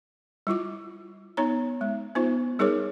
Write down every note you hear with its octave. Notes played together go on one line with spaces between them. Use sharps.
G3 E4 F4 D6
B3 D#4 C#5 A#5
G#3
B3 D#4 F4 C5
G3 D#4 G#4 A#4 C#5 D6